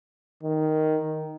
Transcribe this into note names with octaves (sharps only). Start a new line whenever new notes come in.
D#3